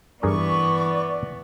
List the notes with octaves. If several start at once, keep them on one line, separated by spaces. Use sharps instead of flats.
G2 E3 B3 G#4 A#4 D5 C#6